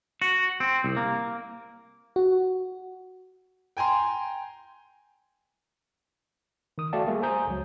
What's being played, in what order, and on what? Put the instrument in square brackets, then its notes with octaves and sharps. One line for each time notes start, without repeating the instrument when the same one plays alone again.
[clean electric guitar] F#4
C4
C2
A#3
[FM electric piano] F#4
[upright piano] G5 G#5 A#5 C6
[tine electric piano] D#3 D#6
A3 F#4 D5 F5 G5 A5
G3 A3 A#3 G#4 A4
C5 G#5 A#5 D#6 G6
C#2 F#3